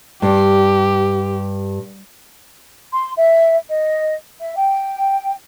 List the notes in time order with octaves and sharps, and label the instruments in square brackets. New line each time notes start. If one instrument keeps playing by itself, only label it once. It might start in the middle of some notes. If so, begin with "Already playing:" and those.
[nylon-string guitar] G2 [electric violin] G4
[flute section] C6
E5
D#5
E5
G5